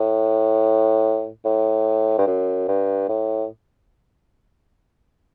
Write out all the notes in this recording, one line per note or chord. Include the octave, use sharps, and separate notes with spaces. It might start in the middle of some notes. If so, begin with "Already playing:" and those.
Already playing: A2
A2
G2
F#2
G2
A2